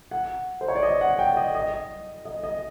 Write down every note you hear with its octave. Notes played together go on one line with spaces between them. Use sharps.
F#5
C5
C#5
D5
D#5
F#5
G5
D#5
D#5
D#5
D#5